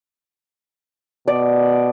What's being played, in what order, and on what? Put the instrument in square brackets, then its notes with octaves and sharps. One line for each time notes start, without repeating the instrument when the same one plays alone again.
[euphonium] B2 [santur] D5